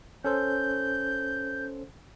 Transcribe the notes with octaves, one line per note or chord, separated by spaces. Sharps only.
C#4 A4 C5 G6